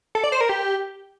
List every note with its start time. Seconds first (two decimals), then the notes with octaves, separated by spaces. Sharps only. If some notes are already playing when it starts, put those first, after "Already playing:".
0.15 A4
0.24 D5
0.32 C5
0.41 A#4
0.49 G4